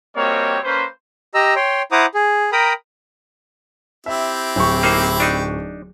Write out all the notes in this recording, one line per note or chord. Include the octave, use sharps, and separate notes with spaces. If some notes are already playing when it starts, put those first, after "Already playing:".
G3 A#3 C4 F#4 C#5 D#5
A#3 C#4 B4 C5
G4 D#5 A#5 E6
C#5 G5 C6
E4 C5 F#5 A#5 D6 D#6
G#4
A#4 G5 A#5 B5 D#6
C4 E4 G4 E5
D1 C#6
A#3 D#4 C5
D4 D#4